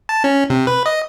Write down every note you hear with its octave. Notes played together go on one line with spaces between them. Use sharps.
A5
C#4
C3
B4
D#5